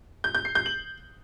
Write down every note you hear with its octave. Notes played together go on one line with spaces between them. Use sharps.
G6
G6
C7
G6
F#7